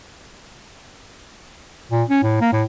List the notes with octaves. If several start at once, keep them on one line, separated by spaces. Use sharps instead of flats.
A#2
C#4
A2
A#3
A2